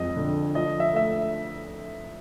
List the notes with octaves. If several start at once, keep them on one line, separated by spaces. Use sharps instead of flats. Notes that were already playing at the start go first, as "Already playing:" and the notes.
Already playing: F2 G#3 D#5
D3
F3 D#5
E5
A3 E5